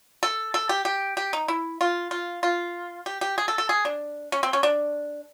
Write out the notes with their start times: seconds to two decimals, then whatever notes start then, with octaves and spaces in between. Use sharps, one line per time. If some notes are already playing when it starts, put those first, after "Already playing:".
0.23 A4
0.54 A4
0.69 G4
0.85 G4
1.17 G4
1.33 D#4
1.48 E4
1.81 F4
2.11 F4
2.43 F4
3.06 G4
3.21 G4
3.38 G#4
3.48 A4
3.58 A4
3.69 G#4
3.85 D4
4.32 C#4
4.43 C4
4.53 C#4
4.63 D4